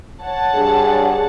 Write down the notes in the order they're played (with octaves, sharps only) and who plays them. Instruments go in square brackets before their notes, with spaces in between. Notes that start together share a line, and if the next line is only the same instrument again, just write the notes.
[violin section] C#5 F#5 A5
[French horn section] G2 G#4